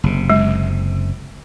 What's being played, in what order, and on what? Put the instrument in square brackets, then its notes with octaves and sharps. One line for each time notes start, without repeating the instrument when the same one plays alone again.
[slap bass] F#1 C3
[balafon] G#3